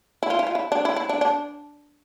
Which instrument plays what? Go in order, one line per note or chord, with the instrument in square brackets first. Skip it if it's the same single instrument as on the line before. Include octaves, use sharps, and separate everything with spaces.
[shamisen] E4
F4
E4
F4
E4
D4
E4
E4
D4
D4